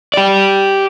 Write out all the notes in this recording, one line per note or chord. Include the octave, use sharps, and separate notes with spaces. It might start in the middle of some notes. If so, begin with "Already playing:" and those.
G4 D5